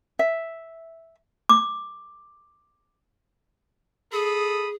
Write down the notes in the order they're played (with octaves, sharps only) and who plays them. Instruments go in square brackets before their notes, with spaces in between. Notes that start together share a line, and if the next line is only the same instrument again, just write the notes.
[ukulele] E5
[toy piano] D6
[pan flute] G#4 [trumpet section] A4 B5 D#6